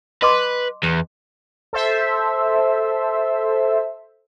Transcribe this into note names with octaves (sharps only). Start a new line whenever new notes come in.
B4 D#5 C6 D6
E2
A4 C5 E5